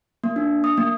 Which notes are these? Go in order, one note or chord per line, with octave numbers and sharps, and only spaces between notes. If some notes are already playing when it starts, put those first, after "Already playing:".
A#3
D4
D#6
A#3